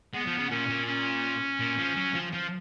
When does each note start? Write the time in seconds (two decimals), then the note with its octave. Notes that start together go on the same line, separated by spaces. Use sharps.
0.14 G#3 B3
0.26 F3
0.38 C#3
0.51 A#2 C#4
0.69 A#2
0.87 C#4
1.59 A#2
1.78 F3
1.96 F#3
2.14 F3
2.33 F3